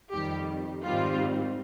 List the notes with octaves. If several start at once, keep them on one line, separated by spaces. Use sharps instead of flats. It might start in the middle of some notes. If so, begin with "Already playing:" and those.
F2 D#3 G3 G4
G#2 D#3 G3 C4 F4